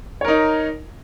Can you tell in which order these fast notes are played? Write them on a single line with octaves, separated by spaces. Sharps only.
C#5 A#4 D#4